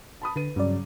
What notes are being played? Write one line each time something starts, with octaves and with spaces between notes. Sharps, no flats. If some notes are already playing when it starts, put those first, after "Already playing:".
A5 B5 D#6
D3 B4 D#7
G2 C#3 F#3 D5